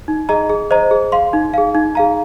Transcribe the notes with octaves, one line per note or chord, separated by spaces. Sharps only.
D#4
G#4 D#5 A#5
G#4
C5 D#5 A#5
G#4
F5 C6
D#4
G#4 F5
D#4
G#4 F5 A#5